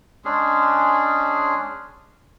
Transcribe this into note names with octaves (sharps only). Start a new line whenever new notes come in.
G#3 C#4 D4 G#4